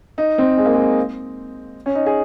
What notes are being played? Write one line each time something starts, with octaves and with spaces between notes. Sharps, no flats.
D#4
C4
G#3
A#3
G#3
C#4
D#4
G#4